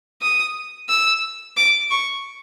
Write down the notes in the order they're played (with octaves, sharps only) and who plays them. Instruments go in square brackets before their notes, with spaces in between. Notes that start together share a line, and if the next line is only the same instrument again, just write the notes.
[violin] D#6
E6
D6
C#6